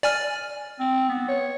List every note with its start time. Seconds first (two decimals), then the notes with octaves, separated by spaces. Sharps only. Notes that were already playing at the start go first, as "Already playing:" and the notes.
0.03 D5 G#5 F6
0.79 C4
1.09 B3
1.28 C#5